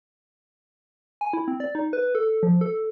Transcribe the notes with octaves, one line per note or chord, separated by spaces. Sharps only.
G#5
E4
C4
D5
D#4
B4
A4
F3
A4